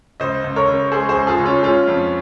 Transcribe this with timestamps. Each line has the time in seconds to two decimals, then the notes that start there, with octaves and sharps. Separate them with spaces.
0.20 C#2 C5 D#5
0.44 C#2
0.56 A#4 C#5
0.69 C#3
0.92 G#3 G#4 C5
1.09 G#4 C5
1.15 C#2
1.27 F4 G#4
1.40 C#2
1.46 C#4 F4
1.63 G#3 C#4 F4
1.87 F2